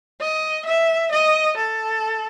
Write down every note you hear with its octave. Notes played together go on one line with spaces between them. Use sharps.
D#5
E5
D#5
A4